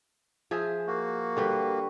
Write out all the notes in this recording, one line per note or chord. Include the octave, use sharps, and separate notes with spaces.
F3 G#4 E5
A#3 F#4
D3 G3 B4